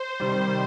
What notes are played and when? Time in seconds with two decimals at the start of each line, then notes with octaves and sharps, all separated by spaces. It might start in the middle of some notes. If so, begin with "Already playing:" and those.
Already playing: C5
0.20 C3 D#3 G3